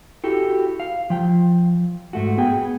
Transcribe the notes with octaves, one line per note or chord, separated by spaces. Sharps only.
E4 F#4 G4 A4
F5
F3 G5
G#2 A3 F#4
B3 G#4 G5